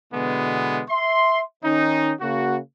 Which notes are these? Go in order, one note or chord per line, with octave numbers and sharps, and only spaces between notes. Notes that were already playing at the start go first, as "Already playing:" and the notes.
B2 D3 E3 G#3 B3
E5 C6
D#3 C#4 D#4
C#3 A#3 F#4